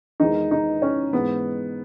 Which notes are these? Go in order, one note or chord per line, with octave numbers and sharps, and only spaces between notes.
E2 D#3 G#3 D#4
D#4
C#4
G#2 E3 G#3 B3